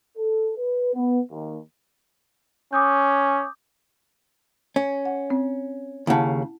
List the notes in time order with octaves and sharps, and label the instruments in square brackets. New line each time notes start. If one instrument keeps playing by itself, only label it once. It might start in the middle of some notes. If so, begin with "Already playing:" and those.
[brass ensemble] A4
B4
B3
D#2
[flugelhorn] C#4 [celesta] D6 D#6 G6
[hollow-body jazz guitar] C#4
[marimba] F#5
C4
[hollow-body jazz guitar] D#2 C#3 [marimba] E4 F#5 A5